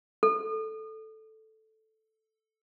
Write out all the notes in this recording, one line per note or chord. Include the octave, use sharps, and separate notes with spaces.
A4